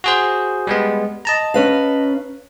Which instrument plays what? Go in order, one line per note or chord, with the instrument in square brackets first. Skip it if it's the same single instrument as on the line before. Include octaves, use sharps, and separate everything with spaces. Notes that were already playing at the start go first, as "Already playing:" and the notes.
[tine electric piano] F#4 G#4 C5
G3 G#3 B3
D#5 A5 A#5
[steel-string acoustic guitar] C#4 B4 F5